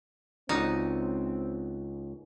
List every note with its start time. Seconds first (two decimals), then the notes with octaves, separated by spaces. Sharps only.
0.49 C#2 C4 D#4 F#4 D5